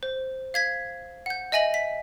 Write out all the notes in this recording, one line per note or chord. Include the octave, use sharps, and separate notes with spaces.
C5
F5 G#6 B6
F#5 G6
D#5 E5 G#5 A#6 F#7
B6